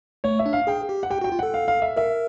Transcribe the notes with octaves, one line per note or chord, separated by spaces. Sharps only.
A3 C#5
E5
D4
F5
G#4 G5
G4
F#5
G4 G5
F#4
G5
F4
A4 F#5
F5
F5
E5
A#4 E5